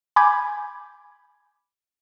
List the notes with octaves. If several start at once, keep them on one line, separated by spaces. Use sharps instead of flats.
G#5 B5 D6 G6 G#6